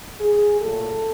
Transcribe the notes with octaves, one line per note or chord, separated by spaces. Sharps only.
G#4
A#2 F#3 A3 A4